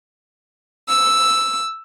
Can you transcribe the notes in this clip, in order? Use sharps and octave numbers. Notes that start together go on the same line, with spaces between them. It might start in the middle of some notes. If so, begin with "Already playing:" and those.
E6